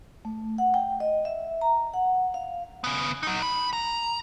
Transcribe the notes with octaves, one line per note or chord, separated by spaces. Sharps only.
A3
F#5
G5
D#5
E5
A#5
F#5
F5
C#3 B3
F#3 D#4
B5
A#5